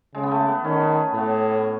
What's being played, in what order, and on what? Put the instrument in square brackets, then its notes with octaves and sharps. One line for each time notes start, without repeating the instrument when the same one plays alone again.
[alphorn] C#3 [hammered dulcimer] G#3
[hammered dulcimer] B3
A3
B3
[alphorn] D#3 [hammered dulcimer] C#4
[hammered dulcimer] B3
[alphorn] A2 [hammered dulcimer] B3